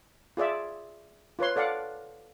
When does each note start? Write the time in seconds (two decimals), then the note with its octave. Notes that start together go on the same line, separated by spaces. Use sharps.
0.37 F4 G#4 D5 E5
1.39 F4 B4 C#5 C6
1.56 A4 D5 F5 F#5